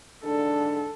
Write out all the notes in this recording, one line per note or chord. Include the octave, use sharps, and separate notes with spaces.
G#2 D3 D4 A4